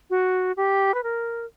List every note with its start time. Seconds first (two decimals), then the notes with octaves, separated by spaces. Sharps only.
0.10 F#4
0.57 G4
0.94 B4
1.03 A#4